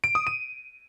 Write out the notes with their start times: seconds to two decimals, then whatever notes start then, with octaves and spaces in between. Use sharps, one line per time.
0.04 D7
0.15 D#6
0.27 D#7